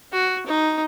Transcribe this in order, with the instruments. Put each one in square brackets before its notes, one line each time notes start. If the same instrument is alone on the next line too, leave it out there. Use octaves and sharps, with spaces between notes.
[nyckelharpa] F#4
D#4